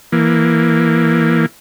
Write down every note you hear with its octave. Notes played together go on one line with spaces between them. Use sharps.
E3 A#3